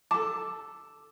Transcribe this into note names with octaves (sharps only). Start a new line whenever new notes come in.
A4 A5 D6